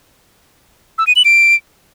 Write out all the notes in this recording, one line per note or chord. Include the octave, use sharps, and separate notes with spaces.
E6
D#7
F#7
D7